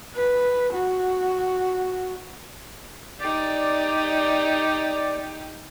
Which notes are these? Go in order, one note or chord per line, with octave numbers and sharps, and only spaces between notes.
B4
F#4
D#4 G4 D5